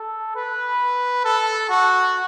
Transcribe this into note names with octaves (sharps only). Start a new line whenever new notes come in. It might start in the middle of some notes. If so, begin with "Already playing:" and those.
Already playing: A4
B4
A4
F#4